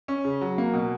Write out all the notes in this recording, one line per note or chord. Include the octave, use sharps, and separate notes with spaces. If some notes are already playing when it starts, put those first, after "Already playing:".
C#4
C#3
F#3
A#3
B2